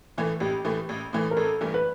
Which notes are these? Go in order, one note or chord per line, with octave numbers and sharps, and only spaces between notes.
A2 E3 A3
A1 G4
A2 E3 A3
A1
A2 E3 A3
A#4
A1 A4
G2 E3 A3
B4